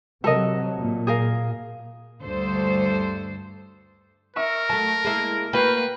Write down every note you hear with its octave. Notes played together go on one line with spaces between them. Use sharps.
C3 F#3 A4 A#4 D#5
A#2
G#4 A#4 F5
D2 G2 A4 C5
A#4 E5 C#6 E7
F#3 A3 A5
G#3 A#3 E4
A#3 F#4 B4 G5